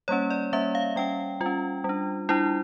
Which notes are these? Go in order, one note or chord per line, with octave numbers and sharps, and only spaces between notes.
G3 A#3 C#4 C#5
D5
G3 A#3 C#4 E5
F5
G3 C#4 G5
G3 F4
C#4
G3 D4
G3 D4 E4